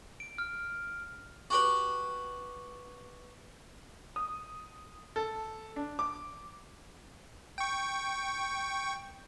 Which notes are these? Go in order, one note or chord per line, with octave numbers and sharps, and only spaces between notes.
D7
F6
F#4 G4 B4
D#6
A4
D4
D6
G5 C#6